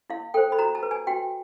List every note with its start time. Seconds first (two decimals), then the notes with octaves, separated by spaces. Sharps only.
0.10 E4 F5
0.34 A4 C5 G5
0.52 B5
0.59 F#4 A#5
0.75 A5
0.83 B4
0.91 G#5
1.07 F#4 G5